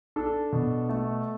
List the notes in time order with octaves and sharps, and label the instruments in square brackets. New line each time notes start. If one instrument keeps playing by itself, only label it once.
[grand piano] D4 A4
B2
A3